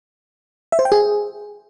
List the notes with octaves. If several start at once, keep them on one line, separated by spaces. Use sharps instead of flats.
E5
C5
G5
G#4